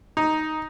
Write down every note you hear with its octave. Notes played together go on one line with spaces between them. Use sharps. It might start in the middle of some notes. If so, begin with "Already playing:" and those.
D#4